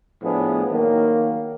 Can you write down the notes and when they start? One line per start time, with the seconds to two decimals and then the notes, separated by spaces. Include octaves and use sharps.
0.23 A2 F3 B3 D4 G#4
0.71 D#3 F#3 A#3